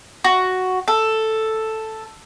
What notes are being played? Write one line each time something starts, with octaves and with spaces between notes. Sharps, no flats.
F#4
A4